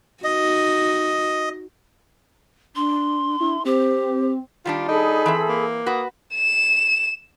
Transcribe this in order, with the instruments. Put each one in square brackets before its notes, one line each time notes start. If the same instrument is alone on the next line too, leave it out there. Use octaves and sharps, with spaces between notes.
[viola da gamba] D#4 F#4 [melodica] D#5
[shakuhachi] D4 [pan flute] C6
[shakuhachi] D4 [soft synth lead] E4
[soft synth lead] C4 [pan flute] G4 [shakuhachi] C5
[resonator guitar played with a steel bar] D#3 G3 D4 [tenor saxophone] F4
[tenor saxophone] D#4 [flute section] G#4 A4 B5
[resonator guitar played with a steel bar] E3 C4 E5
[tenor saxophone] A#3
[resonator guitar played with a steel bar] F#4 B4 [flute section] D#6
[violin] E7